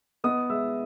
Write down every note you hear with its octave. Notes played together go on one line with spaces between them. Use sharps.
B3 D#5 D#6
G#3 E5 E6